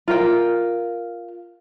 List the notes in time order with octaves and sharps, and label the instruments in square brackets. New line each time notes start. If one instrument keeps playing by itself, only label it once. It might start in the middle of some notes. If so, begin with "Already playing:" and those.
[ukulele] F4 A#4 G5